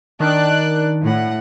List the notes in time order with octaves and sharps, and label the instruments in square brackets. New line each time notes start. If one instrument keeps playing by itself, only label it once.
[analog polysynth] D#3 [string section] D4 D5 F#6
[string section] A2 F#5